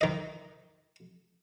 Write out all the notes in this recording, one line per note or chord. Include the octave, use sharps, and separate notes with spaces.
D#3 D#5